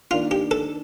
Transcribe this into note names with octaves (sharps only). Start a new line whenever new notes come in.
D#3 A#3 D4 F4
G4
A4